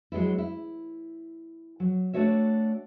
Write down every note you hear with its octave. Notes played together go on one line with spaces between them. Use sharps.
F#3 G#3 B3 E4
E4
F#3
A3 D4 F#4 C#5 E5